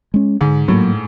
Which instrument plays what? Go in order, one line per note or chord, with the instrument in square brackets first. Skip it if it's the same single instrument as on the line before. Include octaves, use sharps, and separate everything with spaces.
[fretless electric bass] G#3 C#4
[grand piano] G#2 [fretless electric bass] D3
[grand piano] A2 [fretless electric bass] F#3 A#3